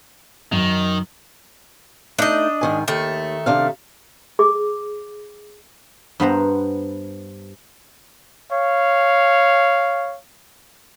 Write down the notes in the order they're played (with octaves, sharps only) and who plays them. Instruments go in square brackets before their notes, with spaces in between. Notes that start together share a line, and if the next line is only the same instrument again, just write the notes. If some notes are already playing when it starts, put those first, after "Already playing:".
[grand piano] F#2 [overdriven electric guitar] D#3
[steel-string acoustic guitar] A3 D#4 [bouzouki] D4 D#5
[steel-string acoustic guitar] G#2 D#3 G#5
[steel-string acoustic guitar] D#2 [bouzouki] D#3 A3
[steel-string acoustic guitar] C3 D4 F5
[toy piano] G#4 D6
[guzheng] G2 B3 C5 A#5
[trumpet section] C#5 F5